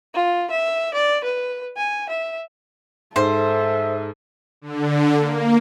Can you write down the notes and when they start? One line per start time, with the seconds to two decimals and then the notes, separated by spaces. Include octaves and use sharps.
0.14 F4
0.51 E5
0.94 D5
1.24 B4
1.77 G#5
2.09 E5
3.16 G#2 A4 C5 E5
4.61 D3
5.18 A#3